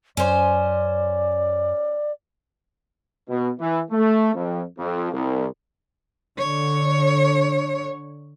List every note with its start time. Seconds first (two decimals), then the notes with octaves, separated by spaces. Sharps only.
0.17 F#2 C#4 C5 D5
3.28 B2
3.60 E3
3.91 A3
4.34 F2
4.78 F2
5.13 C2
6.39 D3 C#5